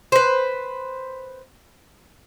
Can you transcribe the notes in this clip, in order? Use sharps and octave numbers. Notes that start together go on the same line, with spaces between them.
B4 C5